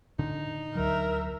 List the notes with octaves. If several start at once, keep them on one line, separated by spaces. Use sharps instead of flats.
A2 D3 D4 D#4
D2 D3 F#3 A#4 E5